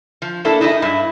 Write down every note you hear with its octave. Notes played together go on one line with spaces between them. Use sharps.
F3
A#3 D4 E4 A4
D#4 E4 G#4 A4 D#5
G2 E4